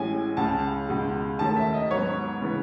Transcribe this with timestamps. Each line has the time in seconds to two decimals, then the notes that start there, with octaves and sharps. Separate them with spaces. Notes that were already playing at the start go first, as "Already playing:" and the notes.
Already playing: A1 A2 G#3 C#4 G#5
0.37 C#2 C#3 G#3 A5
0.89 C#2 B2 G#3
1.39 D#2 D#3 A3 C#4 A5
1.56 E5
1.74 D#5
1.91 G#2 F#3 B3 C#5
2.42 C#3 E3 B3